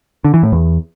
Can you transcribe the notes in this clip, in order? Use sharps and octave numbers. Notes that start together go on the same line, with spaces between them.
D3
E3
A2
E2